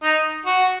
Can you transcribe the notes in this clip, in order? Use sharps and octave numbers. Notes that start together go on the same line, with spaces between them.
D#4
F#4